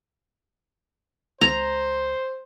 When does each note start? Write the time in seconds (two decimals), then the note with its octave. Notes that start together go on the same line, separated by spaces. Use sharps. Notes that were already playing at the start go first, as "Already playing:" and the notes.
1.41 C#2 C4 C5 A#5